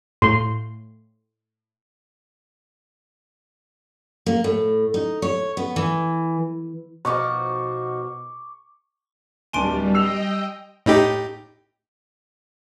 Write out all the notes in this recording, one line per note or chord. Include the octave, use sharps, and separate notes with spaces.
A2 C6
A#3
A2
D#4
C#5
B3
E3
B2 F3 D#4 F#4 C#6 D6
D1 G3 D4 G#5 A5 C6 D7
D#5 G5 E6 C7 F7
A2 D#4 G4